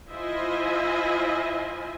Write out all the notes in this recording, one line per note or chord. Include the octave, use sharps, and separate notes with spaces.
E4 F4 C5 D#5 E5 G#5